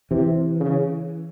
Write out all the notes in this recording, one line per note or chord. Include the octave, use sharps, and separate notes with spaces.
C3 E3
C#3